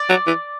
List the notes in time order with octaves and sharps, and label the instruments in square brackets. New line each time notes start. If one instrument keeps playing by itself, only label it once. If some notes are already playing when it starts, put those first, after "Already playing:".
Already playing: [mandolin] D5
[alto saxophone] F#3
E3